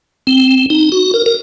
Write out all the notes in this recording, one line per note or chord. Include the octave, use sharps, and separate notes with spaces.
C4
D#4
F#4
A#4
A#4